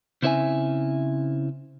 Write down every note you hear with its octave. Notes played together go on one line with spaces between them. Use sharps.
C#3 C4 E4 C5 E5 G#5